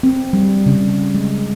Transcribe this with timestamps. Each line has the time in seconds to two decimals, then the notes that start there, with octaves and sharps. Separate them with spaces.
0.03 C4
0.33 G3
0.66 C#3
1.15 G#3